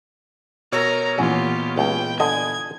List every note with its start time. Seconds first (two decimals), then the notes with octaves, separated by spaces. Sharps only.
0.72 B2 A#4 C#5 A#5 E6
1.18 A#2 E3 B3 C#4 F4 G4
1.78 C#2 G5
2.20 D3 D#5 G#5 D#6 G#6